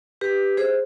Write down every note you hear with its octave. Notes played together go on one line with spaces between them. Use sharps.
G4 B4
G#4 C5